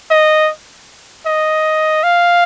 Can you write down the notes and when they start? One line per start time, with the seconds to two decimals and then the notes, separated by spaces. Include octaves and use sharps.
0.10 D#5
1.26 D#5
2.03 F5